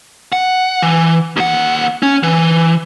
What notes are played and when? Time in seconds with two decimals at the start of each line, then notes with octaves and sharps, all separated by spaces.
0.33 F#5
0.82 E3
1.37 D#2 F#5
2.03 C#4
2.23 E3